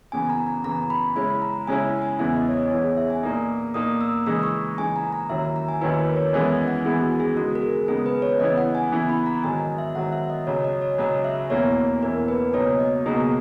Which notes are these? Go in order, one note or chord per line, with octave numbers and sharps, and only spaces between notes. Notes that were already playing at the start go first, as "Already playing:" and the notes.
F#2 C#3 E3 B3 G#5
A#5
A#5
F#2 C#3 E3 B3 A#5
B5
C#3 G#3 C#4 E4 B5
A#5
C#3 G#3 C#4 E4 G#5
G#5
E2 C#3 E3 B3 E4 E5
D#5
C#5
D#5
E2 C#3 E3 B3 E4 C#5
G#4
E5
G#5
A#2 A#3 D#4
A#2 A#3 D#4 D#6
E6
C#3 E3 G#3 D#4 E6
C#6
C#3 E3 G#3 D#4 G#5
A#5
A#5
D#2 D#3 F#3 C#4 E4 E5
E5
A#5
G#5
D#2 D#3 F#3 C#4 E4 B4
A#4
C#5
F#2 E3 G#3 B3 E4 D#5
F#5
F#2 E3 G#3 B3 E4 G#4
F#4
G#4
C#3 G#3 B3 D#4 F#4
A#4
G#4
C#3 G#3 B3 D#4 G#4
B4
C#5
C#3 E3 B3 E4 D#5
F#5
G#5
C#3 E3 B3 E4
B5
A#5
G#2 D#3 F#3 G#5
D#5
E5
G#2 D#3 F#3 F#5
E5
D#5
C#2 C#3 F#3 C#5
D#5
C#5
C#2 C#3 F#3 D#5
E5
E2 B2 A#3 C#4 E4 C#5
E2 B2 A#3 C#4 E4 A#4
B4
C#2 B2 F#3 A#3 D#4 C#5
D#5
C#2 B2 F#3 A#3 D#4 G#4